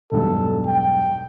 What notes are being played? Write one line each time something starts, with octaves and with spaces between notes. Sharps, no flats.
E1 B1 G2 A4
G5